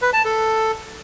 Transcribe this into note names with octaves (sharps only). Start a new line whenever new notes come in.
B4
A5
A4